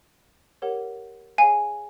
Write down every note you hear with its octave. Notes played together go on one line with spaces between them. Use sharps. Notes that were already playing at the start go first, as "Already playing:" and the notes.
G4 A#4 C#5 F#5
G#4 C#5 F5 G#5